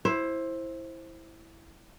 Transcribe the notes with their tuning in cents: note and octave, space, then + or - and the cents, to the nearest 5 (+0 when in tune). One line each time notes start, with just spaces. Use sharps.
E4 +0 C5 +15